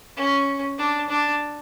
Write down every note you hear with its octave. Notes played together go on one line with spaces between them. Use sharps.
C#4
D4
D4